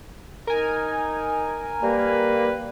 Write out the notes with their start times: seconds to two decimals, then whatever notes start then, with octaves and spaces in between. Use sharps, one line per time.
0.47 D#4 A#4 G#5
1.83 G3 A#3 B4